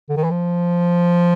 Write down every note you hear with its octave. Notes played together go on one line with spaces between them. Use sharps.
D3
D#3
E3
F3